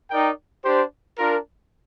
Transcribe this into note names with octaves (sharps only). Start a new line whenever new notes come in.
D#4 A#4 D5 G5
D4 G4 C5
D4 F4 A#4